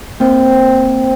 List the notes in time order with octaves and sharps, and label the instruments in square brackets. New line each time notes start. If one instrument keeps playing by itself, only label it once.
[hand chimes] A#3 C4 [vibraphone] C5 G5